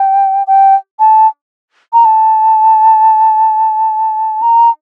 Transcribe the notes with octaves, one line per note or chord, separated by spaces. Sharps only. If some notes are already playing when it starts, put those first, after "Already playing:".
Already playing: G5
G5
A5
A#5
A5
A#5